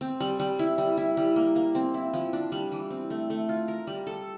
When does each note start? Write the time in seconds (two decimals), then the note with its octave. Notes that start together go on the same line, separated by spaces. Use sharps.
0.01 C4
0.20 G3
0.40 G3
0.59 E4
0.78 G3
0.97 E4
1.17 G3
1.36 A#3
1.56 A#3
1.75 C4
1.94 E4
2.14 F3
2.33 D4
2.52 G3
2.72 E3
2.90 C4
3.10 A3
3.30 A3
3.49 F4
3.68 A#4
3.87 G3
4.07 A4